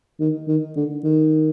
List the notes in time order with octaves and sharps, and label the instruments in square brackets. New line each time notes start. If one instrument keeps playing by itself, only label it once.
[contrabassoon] D#3
D#3
D3
D#3